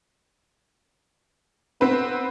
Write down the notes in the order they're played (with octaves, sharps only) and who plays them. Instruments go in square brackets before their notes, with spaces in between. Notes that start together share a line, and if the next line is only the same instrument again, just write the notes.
[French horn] B3 [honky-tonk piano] C4 B4